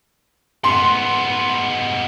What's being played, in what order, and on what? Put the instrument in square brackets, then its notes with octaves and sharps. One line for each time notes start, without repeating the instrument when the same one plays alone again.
[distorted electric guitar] G#2 B3 [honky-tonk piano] C6